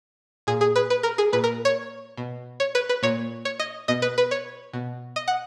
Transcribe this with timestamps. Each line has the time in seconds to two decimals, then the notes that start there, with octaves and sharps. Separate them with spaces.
0.47 A#2 G#4
0.61 G#4
0.76 B4
0.90 B4
1.03 A#4
1.18 G#4
1.33 A#2 B4
1.44 A#4
1.65 C#5
2.18 B2
2.60 C#5
2.75 B4
2.89 B4
3.03 A#2 C#5
3.45 C#5
3.60 D#5
3.88 B2 D#5
4.02 B4
4.18 B4
4.31 C#5
4.74 B2
5.16 D#5
5.28 F#5